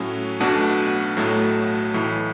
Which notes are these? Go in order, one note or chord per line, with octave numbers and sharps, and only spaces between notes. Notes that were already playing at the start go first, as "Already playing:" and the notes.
Already playing: A2 F#3 C#4
B1 B2 A3 D4 F#4
B1 A2 F#3 A3
B1 A2 E3